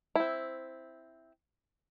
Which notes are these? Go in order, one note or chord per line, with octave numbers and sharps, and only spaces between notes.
C4 E4